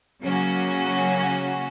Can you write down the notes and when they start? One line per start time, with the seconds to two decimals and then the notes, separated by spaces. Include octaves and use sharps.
0.22 C#3 F#3 A#3 C#4 F#4